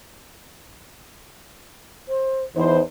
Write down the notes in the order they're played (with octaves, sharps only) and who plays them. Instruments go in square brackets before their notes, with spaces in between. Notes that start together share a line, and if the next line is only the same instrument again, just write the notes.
[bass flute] C5
[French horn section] E2 D#4 C5 [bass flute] E3